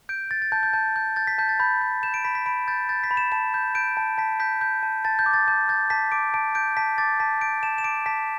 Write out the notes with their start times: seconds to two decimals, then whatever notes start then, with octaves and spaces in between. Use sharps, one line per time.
0.09 G6 D7
0.31 G6 A6
0.42 A6
0.52 A5 G6
0.63 G6
0.73 A5 G6
0.96 G6
1.16 G6 A6
1.27 B6
1.38 A5 G6
1.49 A6
1.60 B5 G6
1.82 G6
2.03 G6 E7
2.14 D7
2.25 B5 B6
2.35 B6
2.46 B5 D7
2.68 G6 A6
2.89 G6 A6
3.04 B6
3.11 B5
3.17 E7
3.32 A5 E7
3.54 G6
3.75 G6 D7
3.97 A5
4.18 A5 B6
4.40 G6 B6
4.61 G6
4.83 A5
5.05 A5 A6
5.19 G6
5.26 D6
5.34 A6
5.48 A5 G6
5.69 G6 A6
5.90 A5 B6
6.12 D6 D7
6.34 A5 D7
6.55 G6 D7
6.77 A5 B6
6.98 D6 A6
7.20 A5 B6
7.41 G6 D7
7.63 A5 E7
7.78 E7
7.84 D6 D7
8.06 A5 B6